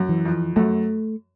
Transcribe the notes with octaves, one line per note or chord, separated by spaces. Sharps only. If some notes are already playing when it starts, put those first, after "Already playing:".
Already playing: F#2
E3
F2
F#2 A3